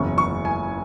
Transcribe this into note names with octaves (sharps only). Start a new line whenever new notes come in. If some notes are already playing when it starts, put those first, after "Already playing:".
Already playing: F#1 E2 C#3 C#6
C#6
G#5